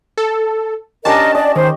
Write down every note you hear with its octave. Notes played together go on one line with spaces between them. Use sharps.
A4
C#4 D4 G4 A#4 D#5 A5
D5 D#5
D#3 C5